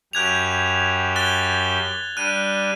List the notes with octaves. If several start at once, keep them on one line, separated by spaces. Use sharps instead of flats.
F#2 G4 F#6 G#6 F7
F#6 A6 G7
G3 D4 F#6 D#7